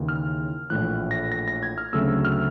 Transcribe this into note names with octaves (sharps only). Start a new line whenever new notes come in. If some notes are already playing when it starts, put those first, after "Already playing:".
Already playing: D#2 C#3 E3
F6
A#1 A2 E3 F#6
A#6
A#6
A#6
G#6
F6
D2 C#3 F#3 A3 C4 E6
F6